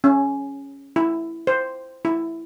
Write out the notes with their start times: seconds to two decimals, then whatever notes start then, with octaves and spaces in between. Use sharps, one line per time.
0.04 C#4
0.96 E4
1.47 C5
2.05 E4